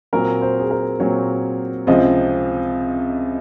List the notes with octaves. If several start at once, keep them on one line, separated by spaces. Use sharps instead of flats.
A#2 F#3 C4 A#4
C5
G#4
A#4
A#2 F#3 C4 C#5
C#2 C3 F3 C4 D#5